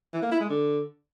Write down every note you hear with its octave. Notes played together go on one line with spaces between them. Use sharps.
E3
A#3
E4
G#3
D3